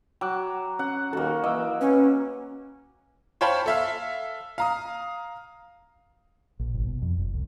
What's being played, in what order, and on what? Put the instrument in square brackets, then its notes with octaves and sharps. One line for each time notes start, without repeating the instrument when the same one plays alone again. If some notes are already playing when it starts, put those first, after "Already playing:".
[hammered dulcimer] F#3 [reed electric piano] G5 D6 F#6
[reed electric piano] C#4 [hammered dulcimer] F#5
[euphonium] D#2 [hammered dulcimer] A#3 F#4 [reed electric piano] A4
[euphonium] E3 [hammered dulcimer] A#3 [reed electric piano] D#5 E6
[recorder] C#4 [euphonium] B4
[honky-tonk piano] C5 C#5 F5 G5 A5 B5
A4 E5 F5
F5 A#5 D#6
[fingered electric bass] A#1
G1
B2
F2
F#1
C2